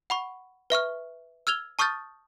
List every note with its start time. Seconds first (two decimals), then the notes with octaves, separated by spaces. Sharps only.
0.10 F#5 B5 C#6
0.70 B4 E5 C#6 F6
1.47 E6 F6 G#6 F7 G7
1.79 A5 C#6 D#6 F6 G6 A6